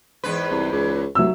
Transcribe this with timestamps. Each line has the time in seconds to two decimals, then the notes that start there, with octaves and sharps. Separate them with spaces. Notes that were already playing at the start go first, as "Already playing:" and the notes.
0.24 E2 G#2 B4
0.51 C2
0.73 C#2
1.15 F1 F#3 E5 E6